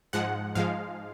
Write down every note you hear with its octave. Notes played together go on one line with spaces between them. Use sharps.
G#2 F3 G#3 F#5
G#2 F3 G#3 F5